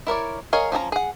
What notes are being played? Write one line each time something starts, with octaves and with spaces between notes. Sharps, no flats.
E4 A#4 C#5 D5
G#4 A#4 C#5 D#5 F5
F3 C#4 G#4 A#5
G#4 F#5